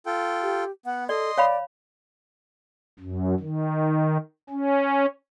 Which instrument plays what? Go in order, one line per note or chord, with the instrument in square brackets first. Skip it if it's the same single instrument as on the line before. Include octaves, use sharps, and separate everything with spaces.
[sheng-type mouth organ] F4 A4 G5
[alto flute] G4
[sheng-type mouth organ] B3 [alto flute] F#5
[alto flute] A4 [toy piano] D5 [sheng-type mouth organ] D#5 C6
[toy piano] C#5 F5 B5 [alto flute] D5
[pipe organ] F#2
D#3
C#4